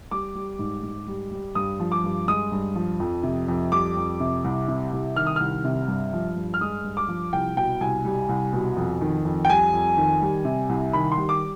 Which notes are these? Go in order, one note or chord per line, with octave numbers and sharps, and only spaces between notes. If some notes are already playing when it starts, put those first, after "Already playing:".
G3 D6
G3
G#2
G#2
G3
G3
G2 D#6
F3
D6
G2
G#3 D#6
G2
F3
F2
C3
F2
G3 D6
F2
C3
C2
C3
C2
D#3 F6
D#6
C2 F6
C3
G2
F3
G2
F6
G#3 D#6
G2
D6
F3
C2 G5
B2 G5
C2 G#5
G3
C2
B2
F2
D#3
F2
G5
G3 G#5
F2
D#3
G3
C3
C2
D#3 B5
C6
G3
D6